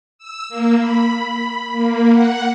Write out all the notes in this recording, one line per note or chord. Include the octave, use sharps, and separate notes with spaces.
E6
A#3
B5
A#3
F#5